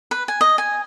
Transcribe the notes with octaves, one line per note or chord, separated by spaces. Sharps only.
B4
G#5
D#5
G#5